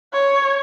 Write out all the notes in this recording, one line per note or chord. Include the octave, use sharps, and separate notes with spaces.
C#5